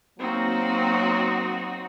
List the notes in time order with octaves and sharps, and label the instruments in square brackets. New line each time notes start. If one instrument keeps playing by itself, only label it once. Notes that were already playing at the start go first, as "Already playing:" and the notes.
[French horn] F#3 [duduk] A#3 [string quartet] C4 D#4 F#4